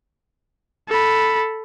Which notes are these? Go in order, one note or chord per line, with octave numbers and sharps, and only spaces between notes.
A4 B5